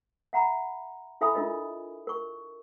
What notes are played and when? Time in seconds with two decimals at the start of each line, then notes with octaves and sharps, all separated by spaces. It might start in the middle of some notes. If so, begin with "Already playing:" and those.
0.33 E5 F#5 A#5 B5
1.21 E4 A4 E5 G#5 B5 D#6
1.35 D4 F4 A#4 D#5
2.07 A#4 C#6